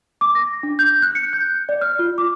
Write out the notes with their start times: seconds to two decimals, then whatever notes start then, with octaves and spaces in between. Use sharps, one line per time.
0.21 D6
0.35 A#6
0.63 D4
0.79 G6
1.02 F#6
1.15 C#7
1.33 G6
1.69 D5
1.81 F6
1.99 F4
2.18 D6